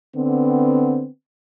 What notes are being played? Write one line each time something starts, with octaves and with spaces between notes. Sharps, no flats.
D3 B3 C4